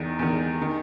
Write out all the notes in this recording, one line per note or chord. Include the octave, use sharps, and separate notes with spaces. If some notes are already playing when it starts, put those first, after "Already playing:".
Already playing: E2 D#3
E2 D#3
D#3